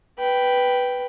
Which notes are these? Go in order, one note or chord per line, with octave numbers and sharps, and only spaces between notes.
B4 G5